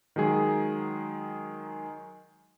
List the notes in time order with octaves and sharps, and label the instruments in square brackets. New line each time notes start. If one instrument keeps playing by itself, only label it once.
[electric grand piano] D#3 F#3 G#3 G#4